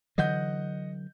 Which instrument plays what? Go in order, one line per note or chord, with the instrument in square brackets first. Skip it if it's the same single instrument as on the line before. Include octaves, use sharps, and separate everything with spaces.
[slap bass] D3 E3 F#3 [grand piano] D#5 F#5 G6